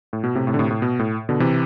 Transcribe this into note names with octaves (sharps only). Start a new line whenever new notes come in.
A2
B2
A2 C3
A2 C3
D3
A2 C3
A2
B2
A2
B2 D3
C3 E3